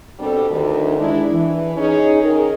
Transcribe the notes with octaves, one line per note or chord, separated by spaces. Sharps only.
B2 G3 C4 D4 G4 A4
D2 D#3
G#3 D4 E4
E3
C#4 D#4 G#4
D#3 G#4 A#4